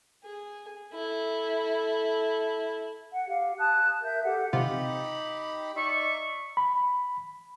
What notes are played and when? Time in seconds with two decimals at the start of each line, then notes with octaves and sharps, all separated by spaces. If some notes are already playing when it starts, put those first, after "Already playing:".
0.25 G#4
0.93 E4 A4
3.13 F#5
3.28 G4 F5
3.59 A5 D#6 F#6
4.04 A#4 E5 G6
4.24 G4 A4 F#5
4.53 C3 D#4 F4 G4 B5
5.76 D#4 D5 E5 C#6
6.57 B5